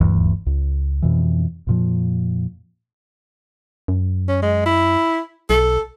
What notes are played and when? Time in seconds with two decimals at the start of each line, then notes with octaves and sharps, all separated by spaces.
0.01 D#1 D2 G2 E3
0.46 C#2
1.02 F2 B2 E3
1.67 F2 A#2 F3
3.88 F#2
4.28 C#4
4.42 G#3
4.66 E4
5.50 B1 A4